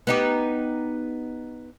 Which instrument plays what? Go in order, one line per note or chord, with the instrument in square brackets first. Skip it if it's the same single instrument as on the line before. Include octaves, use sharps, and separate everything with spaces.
[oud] B3 D#4 G4